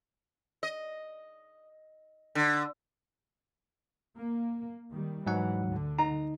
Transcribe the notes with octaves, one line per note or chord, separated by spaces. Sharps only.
D#5
D3
A#3
D#3 G3
G#2 E3 F#3 F#5
D2 D3
D#4 A#5